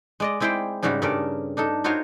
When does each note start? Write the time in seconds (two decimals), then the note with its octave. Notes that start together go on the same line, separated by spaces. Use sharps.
0.20 G#3 D5 D#5
0.40 G#3 C4 E4 C5 D5 G5
0.82 G#2 C#3 G3 C4 F#4
1.02 G2 C#3 A4 A#4 D5
1.57 D4 D#4 A4
1.84 D#4 F4 F#4 C5 C#5 F5